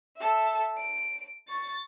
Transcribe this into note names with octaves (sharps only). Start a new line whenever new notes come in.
A4 E5
D7
C#6 A6